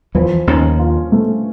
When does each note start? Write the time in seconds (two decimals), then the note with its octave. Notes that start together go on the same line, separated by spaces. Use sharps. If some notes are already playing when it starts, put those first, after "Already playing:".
0.15 E2 E3 F3
0.47 D#2 D#3 C#4
0.79 F4
1.12 A3